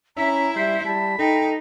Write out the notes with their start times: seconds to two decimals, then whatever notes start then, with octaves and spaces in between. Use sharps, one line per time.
0.17 C#4 E4 E5 A#5
0.56 G3 C5 E5
0.85 G3 A5 B5
1.19 D#4 A4 G5